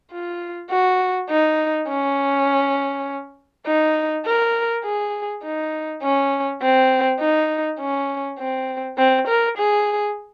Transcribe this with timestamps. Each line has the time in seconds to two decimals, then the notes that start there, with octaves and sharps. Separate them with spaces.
0.11 F4
0.70 F#4
1.30 D#4
1.88 C#4
3.66 D#4
4.25 A#4
4.84 G#4
5.43 D#4
6.02 C#4
6.62 C4
7.20 D#4
7.80 C#4
8.39 C4
8.98 C4
9.28 A#4
9.57 G#4